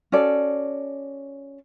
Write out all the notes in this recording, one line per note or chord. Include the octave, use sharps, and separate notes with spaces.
C#4 F#4 A4 D5